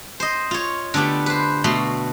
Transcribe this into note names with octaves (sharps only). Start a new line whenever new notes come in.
C5 D#5
F4 C#5
D3 A3 B3 D4 G4
B4 C5
B2 A3 F#4 C6